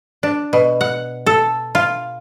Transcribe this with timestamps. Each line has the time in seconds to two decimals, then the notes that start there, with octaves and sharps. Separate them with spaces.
0.23 D4
0.53 B2
0.81 F#5
1.26 A4
1.75 F4